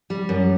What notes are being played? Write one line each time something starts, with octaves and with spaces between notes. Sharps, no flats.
G3
F#2